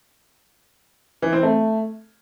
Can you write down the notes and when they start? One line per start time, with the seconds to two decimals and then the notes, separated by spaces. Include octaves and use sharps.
1.22 E3
1.33 C4
1.43 A3